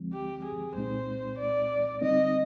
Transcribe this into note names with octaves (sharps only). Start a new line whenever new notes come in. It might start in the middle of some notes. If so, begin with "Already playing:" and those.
Already playing: D2 D3 F3 G#3 C4
G4
G#4
C2 A#2 G#3 C4 D#4 C5
D5
D3 G3 C4 D#4 D#5